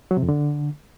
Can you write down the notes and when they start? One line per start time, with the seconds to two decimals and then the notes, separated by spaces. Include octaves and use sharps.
0.11 F#3
0.17 C3
0.23 F2
0.29 D3